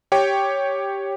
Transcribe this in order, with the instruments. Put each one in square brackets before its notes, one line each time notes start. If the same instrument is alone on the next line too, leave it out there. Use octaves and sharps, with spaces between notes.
[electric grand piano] G4 C#5 G5